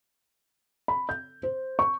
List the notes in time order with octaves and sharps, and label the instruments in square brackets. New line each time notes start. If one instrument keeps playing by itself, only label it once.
[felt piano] B5
G6
C5
C#6